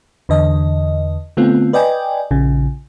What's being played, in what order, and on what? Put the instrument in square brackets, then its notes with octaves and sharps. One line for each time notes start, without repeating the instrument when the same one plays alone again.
[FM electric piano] E2 D3 D#5
D3 A3 B3 C4 F4
B4 D5 D#5 G5 G#5
A#1 C#3